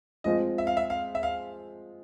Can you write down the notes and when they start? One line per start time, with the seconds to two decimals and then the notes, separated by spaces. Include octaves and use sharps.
0.24 F3 G#3 C4 F4 D#5
0.58 E5
0.67 F5
0.77 E5
0.90 F5
1.15 E5
1.23 F5